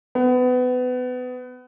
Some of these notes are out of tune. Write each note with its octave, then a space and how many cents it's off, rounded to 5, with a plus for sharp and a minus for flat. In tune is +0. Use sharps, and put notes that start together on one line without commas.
B3 +25